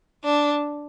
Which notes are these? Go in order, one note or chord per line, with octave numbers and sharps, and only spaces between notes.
D4